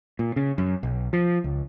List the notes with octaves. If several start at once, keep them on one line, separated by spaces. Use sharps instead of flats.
A#2
C#3
F#2
B1
F3
C#2